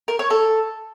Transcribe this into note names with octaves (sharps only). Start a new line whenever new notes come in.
A#4
C#5
A4